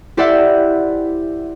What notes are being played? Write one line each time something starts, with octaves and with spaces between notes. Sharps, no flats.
E4 G4 C5 D5 E5 F#5